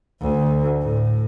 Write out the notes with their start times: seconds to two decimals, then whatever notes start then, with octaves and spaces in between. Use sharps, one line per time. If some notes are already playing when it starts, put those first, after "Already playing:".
0.21 D2
0.82 A2